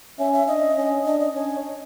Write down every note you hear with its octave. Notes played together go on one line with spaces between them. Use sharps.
C#4 E5
E5
D4 D#5
C#4
D4 D#5
D#5
C#4 C#5